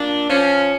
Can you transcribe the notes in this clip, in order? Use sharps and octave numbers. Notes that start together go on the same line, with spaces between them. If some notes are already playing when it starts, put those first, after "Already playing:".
Already playing: A#2 D4
F3 C#4